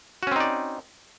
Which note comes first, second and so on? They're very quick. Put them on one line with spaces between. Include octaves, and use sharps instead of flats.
F#4 C#4 C4 D#4 D5